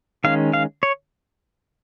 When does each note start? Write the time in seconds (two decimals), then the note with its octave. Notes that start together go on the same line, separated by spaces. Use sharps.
0.24 D#3 G#3 C#4 F5
0.54 F5
0.83 C#5